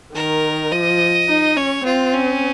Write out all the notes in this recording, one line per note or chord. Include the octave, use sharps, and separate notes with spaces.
D#3 A#4
F3 D#5
D#4
C#4 C#5
C4 F4
C#4